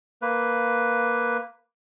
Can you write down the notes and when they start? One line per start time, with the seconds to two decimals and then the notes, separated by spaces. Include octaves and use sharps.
0.22 A#3 B4